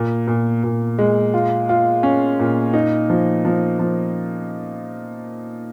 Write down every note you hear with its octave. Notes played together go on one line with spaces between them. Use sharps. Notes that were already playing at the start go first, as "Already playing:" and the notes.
Already playing: A#2
A#2
A#2
G#3
F4
F4
C#4
A#2
D#4
F3
F3
F3